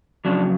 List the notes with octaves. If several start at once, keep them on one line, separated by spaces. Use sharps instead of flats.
F2 C#3 F#3 D4